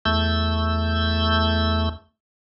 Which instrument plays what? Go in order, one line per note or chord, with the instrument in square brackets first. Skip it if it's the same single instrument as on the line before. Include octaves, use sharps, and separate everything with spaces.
[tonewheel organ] E2 A3 E6 G6